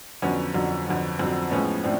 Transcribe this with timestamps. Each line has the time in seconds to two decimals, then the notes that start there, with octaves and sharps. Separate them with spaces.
0.22 F2 D3 F#3 B3 C#4
0.54 F2 D3 F#3
0.86 F2 D3 F#3
1.19 F2 D3 F#3 C4
1.51 A2 F3 G#3 B3 C#4
1.84 A2 C4 D4